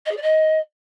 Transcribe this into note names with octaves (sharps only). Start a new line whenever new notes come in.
D#5
G#4
D5
D#5